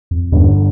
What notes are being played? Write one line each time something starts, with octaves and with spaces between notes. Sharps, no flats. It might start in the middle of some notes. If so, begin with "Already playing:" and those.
F2
G1 E2 G2 D3